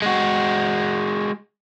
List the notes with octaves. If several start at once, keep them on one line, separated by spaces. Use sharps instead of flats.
G#3 F#4